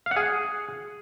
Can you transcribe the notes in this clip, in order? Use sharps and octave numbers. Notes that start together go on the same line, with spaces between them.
F5
F#5
G#4